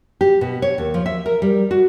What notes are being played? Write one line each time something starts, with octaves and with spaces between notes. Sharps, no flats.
G4
B2
C#5
D#2
F3
E5
A#4
G3
F#4